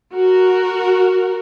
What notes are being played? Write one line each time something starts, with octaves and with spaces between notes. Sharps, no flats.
F#4 A#4